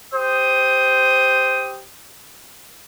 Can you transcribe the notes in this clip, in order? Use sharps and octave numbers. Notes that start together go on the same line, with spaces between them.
G4 C5 D#6